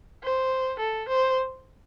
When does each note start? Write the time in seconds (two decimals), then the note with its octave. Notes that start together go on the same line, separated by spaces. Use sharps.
0.24 C5
0.79 A4
1.09 C5